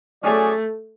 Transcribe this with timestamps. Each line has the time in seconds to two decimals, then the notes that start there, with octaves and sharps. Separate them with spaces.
0.23 F#3 A3 C#4 G#4 D5